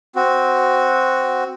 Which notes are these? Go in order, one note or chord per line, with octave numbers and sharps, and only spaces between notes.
C4 F#4